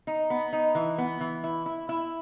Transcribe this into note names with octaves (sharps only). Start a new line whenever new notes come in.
D#4
B3
D#4
E3
B3
E3
E4
E4
E4